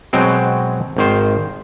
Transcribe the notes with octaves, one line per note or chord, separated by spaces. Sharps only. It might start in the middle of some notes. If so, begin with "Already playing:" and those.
B2 F#3 G#3 C4 G5
G#1 D#3 C5